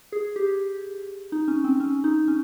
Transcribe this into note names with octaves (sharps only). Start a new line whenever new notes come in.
G#4
G4
D#4
C#4
C4
C#4
D#4
C#4